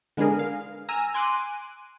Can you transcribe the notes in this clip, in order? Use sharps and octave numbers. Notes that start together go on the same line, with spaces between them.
D3 G#3 B3 D4 G#4 A#4
F5
G#5 A#5 E6 F6 A#6
G#5 C6 D6 F#6 D7 D#7